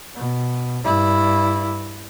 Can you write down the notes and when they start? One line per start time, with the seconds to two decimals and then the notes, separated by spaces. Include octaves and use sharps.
0.15 B2
0.84 G2 E4